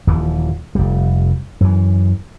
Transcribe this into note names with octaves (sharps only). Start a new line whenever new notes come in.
D#1 D#2 E3 F3
F1 G3
F#2 E3